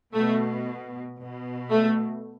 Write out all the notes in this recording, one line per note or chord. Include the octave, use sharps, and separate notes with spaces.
B2 A3
B2
A3